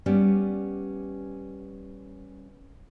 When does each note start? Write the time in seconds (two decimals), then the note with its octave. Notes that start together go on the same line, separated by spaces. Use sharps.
0.06 G3 B3 C#4 D5